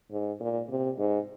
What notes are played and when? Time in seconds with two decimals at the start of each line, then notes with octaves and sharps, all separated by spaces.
0.12 G#2
0.40 A#2
0.70 C3
0.98 G#2